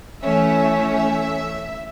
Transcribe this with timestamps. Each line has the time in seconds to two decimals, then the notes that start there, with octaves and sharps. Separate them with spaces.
0.23 E3 A3 C#4 E5
0.96 E5